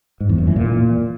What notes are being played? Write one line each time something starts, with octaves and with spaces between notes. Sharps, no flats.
G#2
E2
F#2
E3
A#2